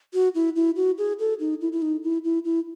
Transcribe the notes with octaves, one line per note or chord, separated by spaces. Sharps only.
F#4
E4
E4
F#4
G#4
A4
D#4
E4
E4
D#4
E4
E4
E4